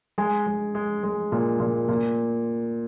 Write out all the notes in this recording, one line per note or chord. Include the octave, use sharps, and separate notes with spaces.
G#3 G#5
G#3
G#3
G#3
A#2
A#2
A#2